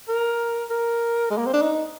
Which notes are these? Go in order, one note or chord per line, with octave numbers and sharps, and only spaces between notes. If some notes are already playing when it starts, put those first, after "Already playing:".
A#4
A#4
G#3
A#3
C4
D4
D#4